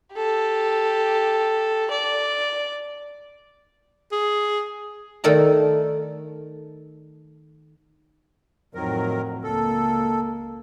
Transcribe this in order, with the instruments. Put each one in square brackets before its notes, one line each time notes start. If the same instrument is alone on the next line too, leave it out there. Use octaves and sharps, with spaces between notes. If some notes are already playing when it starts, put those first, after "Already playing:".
[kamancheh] G4 A4
D5
[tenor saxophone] G#4
[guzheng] D#3 A3 A4 A#4 D5 A#5
[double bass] F2 A2 [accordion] D#3 F#3 A#4
[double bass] C#2 A#3 [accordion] A4